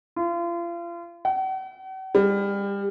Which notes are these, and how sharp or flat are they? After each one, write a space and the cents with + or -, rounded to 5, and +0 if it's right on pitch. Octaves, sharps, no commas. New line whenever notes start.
F4 -35
F#5 +45
G3 +30